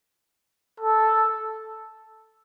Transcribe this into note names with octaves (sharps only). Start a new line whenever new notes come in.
A4